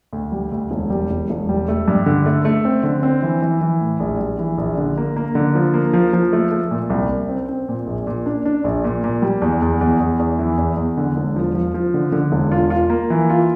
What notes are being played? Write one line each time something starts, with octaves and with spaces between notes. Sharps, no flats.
D2
G3
D2
E1
G3
E1
E1
G3
A3
G2
D3
A3
A3
C4
D3
C4
E3
E3
E3
A2
A#1
G3
E3
A#1
D3
A#3
A#3
D3
F3
A#3
F3
F3
A3
A3
A#2
C2
C2
C4
C4
A#2
A#1
A#2
D4
D4
A#1
A#2
A#2
G3
E2
E2
E2
E2
E2
E3
E2
E2
D3
E1
F3
F3
F3
D3
D3
E1
F4
F4
A#3
E3
F4